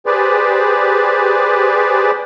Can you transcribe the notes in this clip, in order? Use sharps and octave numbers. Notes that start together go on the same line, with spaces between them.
G4 G#4 B4 C5 D5